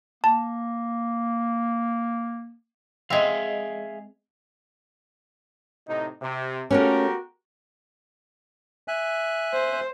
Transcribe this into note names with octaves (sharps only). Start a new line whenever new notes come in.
A#3 A5
G#3 C4 G#4 E5 F5
A2 C3 D#4
C3
A3 A#3 C#4 F#4 G4 A#4
E5 G#5 F#6
C5